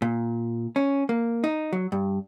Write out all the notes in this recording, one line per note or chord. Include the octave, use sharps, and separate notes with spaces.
A#2
C#4
A#3
D#4
F#3
G2